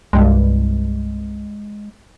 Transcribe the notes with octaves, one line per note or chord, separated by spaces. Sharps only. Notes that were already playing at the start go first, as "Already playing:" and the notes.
C2 G2 G#3